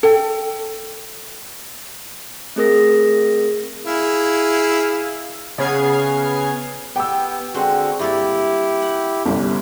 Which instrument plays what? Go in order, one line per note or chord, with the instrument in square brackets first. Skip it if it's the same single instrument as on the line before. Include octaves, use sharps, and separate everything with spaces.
[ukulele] A4 G5
[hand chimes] A3 C4 G#4 A#4 D#6 A#6
[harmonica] E4 G#4 F5
[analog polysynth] C#3 B3 G#4 F6 G#6 C7
[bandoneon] B3 [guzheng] G4 [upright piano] G5 E6
[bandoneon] D3 F#4 [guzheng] G#3 C4
[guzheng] G2 A#3 A4 [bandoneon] E4 G4
[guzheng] F#5
[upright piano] G1 C2 C#4